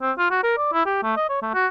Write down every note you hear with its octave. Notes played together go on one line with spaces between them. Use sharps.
C4
F4
F#4
A#4
D5
E4
G4
A3
D#5
C#5
A3
F#4